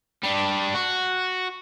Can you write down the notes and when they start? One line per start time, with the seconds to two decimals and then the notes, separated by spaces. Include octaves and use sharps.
0.24 G3 D4
0.74 F#4